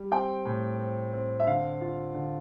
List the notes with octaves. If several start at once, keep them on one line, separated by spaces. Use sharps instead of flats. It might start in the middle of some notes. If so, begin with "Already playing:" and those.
Already playing: G3
C4 G5
A2
C4
C4
E5
D3 F5
F4
D3